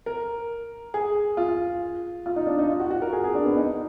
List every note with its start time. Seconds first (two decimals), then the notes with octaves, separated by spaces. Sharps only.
0.06 A#4
0.94 G#4
1.37 F4
2.26 F4
2.36 D#4
2.47 D4
2.59 D#4
2.69 F4
2.80 F#4
2.91 F#4
3.02 A#4
3.13 G#4
3.24 G#4
3.35 D4
3.45 B3
3.57 D#4